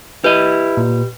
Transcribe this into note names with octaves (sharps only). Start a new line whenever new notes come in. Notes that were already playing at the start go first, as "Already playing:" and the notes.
E4 G4 B4 D#5
A#2